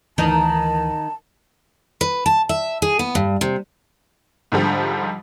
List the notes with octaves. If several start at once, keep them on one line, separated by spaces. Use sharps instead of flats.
D2 D#3 E3 D#4 A5
B4
A5
E5
G#4
B3
G2
C3
G#2 D3 F3 G3